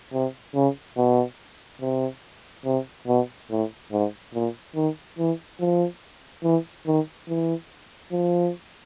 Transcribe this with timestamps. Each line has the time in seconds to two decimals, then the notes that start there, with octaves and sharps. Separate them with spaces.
0.13 C3
0.55 C#3
0.97 B2
1.81 C3
2.65 C3
3.07 B2
3.51 A2
3.92 G#2
4.34 A#2
4.76 D#3
5.19 E3
5.60 F3
6.44 E3
6.87 D#3
7.29 E3
8.12 F3